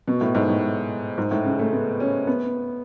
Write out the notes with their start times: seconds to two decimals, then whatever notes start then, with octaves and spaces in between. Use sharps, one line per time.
0.08 B2
0.21 A2
0.35 G#2
0.49 A2
1.18 G#2
1.31 A2
1.44 C#3
1.59 A3
1.73 B3
2.00 C#4
2.27 B3